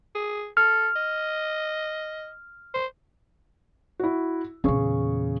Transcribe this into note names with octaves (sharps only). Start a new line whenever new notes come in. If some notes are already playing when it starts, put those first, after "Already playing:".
G#4
A4 F6
D#5
C5
E4 F#4
E2 A#2 C#3 G#4 C#6